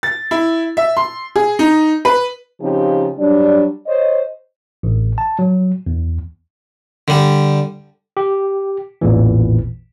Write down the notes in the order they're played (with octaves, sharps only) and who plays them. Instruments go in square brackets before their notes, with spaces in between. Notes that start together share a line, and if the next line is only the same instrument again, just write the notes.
[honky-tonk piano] A6
E4
E5
C6
G#4
D#4
B4
[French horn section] C#3 F3 C4 D#4 G4
F#3 G3 D4
C5 C#5 D#5
[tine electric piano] A1
A5
F#3
E2
[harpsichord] D3 G3
[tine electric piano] G4
A1 E2 A#2 E3